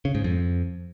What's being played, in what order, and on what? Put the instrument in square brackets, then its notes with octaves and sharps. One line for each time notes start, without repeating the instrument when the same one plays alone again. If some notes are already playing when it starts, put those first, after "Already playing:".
[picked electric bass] C#3
G#2
F2